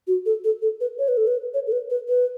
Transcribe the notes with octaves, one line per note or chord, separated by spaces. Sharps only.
F#4
A4
A4
A4
B4
C#5
B4
A4
B4
C#5
A4
B4
B4
B4